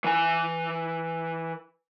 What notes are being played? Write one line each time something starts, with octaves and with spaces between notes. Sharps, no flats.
E3 G#5